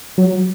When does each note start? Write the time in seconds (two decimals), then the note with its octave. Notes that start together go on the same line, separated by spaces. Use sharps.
0.18 F#3